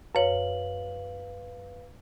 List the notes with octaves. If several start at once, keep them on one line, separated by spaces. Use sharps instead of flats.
F#2 B4 C#5 F5 F#7